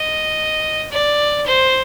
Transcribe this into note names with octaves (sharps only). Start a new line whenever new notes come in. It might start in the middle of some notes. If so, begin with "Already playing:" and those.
Already playing: D#5
D5
C5